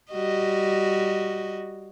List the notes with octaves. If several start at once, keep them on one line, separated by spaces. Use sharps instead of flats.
G3 F#4 D#5